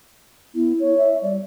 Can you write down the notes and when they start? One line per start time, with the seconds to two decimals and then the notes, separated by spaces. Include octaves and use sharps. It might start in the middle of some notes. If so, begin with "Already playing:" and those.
0.55 B3 E4
0.80 C#5
0.98 E5
1.22 G3 D5